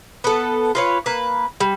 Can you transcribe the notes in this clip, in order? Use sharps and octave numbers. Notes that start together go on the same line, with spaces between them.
B3 A4
F4 B4 C#5
A#3 B4
G3